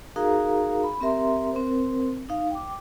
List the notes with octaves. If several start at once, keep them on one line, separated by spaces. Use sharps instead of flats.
D#4 F#4 G#4 A#4 F5 A#5
B5
C4 G4 A#4 E5 A#5 C6
C4 A#4 C5
D#4 F5
G5 D6